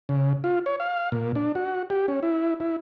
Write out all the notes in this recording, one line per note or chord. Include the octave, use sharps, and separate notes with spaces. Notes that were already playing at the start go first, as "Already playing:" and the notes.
C#3
F4
C#5
F5
A#2
D4
F#4
G4
C#4
E4
E4